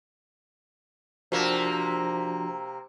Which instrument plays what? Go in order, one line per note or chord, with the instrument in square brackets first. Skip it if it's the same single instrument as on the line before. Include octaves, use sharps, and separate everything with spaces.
[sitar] C3 A#3 [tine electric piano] F3 D4 F#4